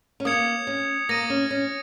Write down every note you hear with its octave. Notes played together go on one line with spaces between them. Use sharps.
C#4
A#3 D#6 G#6 C#7 F7
C#4
A#3 D#6 A#6 D#7
C#4
C#4